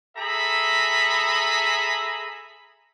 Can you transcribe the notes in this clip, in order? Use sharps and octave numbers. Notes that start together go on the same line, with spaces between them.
G#4 A4 E5 A#5 B5